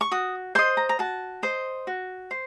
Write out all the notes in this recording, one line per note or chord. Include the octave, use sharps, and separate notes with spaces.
C#6
F#4 D#6
C5 D#5 C6
A#5
A#5
F#4 A5
C5 D#5
F#4
C5